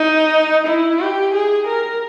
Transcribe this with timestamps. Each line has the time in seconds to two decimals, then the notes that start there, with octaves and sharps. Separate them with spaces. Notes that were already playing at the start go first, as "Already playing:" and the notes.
Already playing: D#4
0.66 E4
1.00 G4
1.34 G#4
1.67 A#4